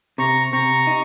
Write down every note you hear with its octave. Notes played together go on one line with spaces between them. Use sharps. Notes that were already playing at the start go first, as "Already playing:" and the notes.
C3 A#5 C#6
C3 A#5 C#6
D#4